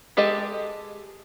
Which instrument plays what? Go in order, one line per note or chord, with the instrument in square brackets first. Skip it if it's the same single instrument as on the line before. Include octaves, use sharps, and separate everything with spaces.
[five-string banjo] G#3 G4 A4 D#5